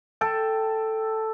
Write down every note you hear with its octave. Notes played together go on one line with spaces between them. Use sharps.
A4 G5